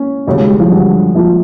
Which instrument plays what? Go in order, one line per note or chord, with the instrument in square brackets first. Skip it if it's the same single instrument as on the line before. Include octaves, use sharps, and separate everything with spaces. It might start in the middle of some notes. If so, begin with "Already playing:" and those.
Already playing: [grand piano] A#3 C#4
[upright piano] E1 D#2 C#3 F#3
[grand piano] G#3
G3
F3
[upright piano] G2 D3 G3 [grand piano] F#3
[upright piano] A#1 A#2 F3